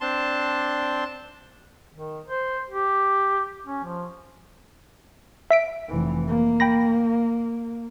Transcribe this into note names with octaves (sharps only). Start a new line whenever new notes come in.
C4 D4 A5 C6
D#3
C5
G4
C#4
F3
E5 B6 D7
F1 E3
A#3
G5 B5 A#6